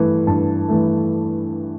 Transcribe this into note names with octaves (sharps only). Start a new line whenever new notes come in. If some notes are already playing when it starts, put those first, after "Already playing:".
Already playing: G2 E3 A3
G2 A5
E3 A3